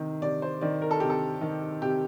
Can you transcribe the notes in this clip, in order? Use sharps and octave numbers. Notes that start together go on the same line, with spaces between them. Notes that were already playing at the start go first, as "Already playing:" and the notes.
Already playing: C3 D#3
C3 D5
C5
D#3 D5
A#4
A4
C3 G4
A4
D#3
C3 G4